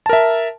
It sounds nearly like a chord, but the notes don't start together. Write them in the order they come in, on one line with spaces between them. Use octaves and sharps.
A5 A#4 E5